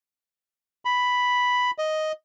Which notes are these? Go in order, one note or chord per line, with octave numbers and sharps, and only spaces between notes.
B5
D#5